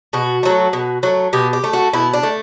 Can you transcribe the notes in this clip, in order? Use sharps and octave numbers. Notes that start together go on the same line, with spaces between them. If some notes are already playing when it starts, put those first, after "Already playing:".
B2 F#4
F#3 A3
B2
F#3 A3
B2 G4
G4
A3
F#4
B2 E4
D4
A3